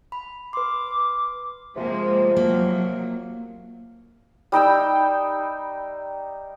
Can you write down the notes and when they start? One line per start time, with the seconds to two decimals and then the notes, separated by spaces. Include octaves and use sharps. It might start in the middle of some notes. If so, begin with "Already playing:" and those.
0.12 B5
0.53 B4 C6 D6
1.77 C3 F3 G#3 A#3
2.36 F#3 A#3
4.52 G3 D#4 G5 E6